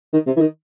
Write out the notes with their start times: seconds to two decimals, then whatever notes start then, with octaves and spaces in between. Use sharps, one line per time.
0.13 D#3
0.27 C3
0.36 E3
0.40 D#3